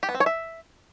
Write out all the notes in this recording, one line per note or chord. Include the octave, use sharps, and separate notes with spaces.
G4
B3
C4
C#5
E5